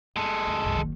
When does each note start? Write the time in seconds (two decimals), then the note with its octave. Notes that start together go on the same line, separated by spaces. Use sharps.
0.16 G1 G#3 A4
0.47 D2
0.62 C2 F#2
0.77 F#1 D#3